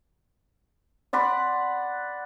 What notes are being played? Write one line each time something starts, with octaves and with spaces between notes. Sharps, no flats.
D5 F#5 B5 C6